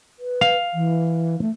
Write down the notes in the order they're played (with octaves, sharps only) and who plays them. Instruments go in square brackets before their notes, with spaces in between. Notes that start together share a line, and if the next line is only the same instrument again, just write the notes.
[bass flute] B4
[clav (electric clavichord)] F5
[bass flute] E3
A3